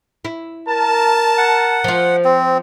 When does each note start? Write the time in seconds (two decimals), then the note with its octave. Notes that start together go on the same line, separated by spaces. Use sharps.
0.25 E4
0.68 A#4 A5
1.38 F#5
1.84 F3 F4
2.25 C4